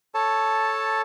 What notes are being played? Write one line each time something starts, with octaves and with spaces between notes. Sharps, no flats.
A4 C#5 A5